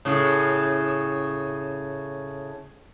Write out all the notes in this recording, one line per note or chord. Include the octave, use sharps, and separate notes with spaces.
A2 C#3